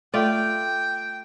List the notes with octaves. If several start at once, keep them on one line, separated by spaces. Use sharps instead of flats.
A3 F4 D5 G5